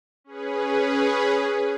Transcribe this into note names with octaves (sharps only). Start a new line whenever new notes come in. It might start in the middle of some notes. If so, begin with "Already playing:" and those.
C#4 G#4 B4